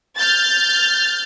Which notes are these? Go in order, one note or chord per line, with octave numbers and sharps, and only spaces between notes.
F6 G6 A6